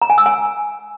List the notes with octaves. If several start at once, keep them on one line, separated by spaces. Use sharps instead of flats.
A#5
G#5
E6
G#5